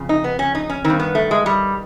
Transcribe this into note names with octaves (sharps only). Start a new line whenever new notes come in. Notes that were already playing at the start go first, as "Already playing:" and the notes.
Already playing: F2 C#3
D#4
B3
C#4
D#4
C#4
D#3 C4
G2
B3
A3
G#3
G3